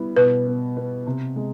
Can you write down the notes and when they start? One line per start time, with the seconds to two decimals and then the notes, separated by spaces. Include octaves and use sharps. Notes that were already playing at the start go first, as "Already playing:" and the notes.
Already playing: G3 B3 E4
0.16 B2 B4
0.47 B3
0.77 B3
1.07 C3
1.36 G#3